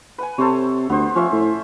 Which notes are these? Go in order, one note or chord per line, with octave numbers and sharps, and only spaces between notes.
B4 F#5 G#5
C3 A4 C5 C#5
D2 B3 C5
F3 C#4 C5 E5
A2